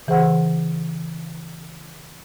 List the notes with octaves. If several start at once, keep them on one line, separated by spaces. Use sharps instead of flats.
C#3 E3 G#4 C5 F#5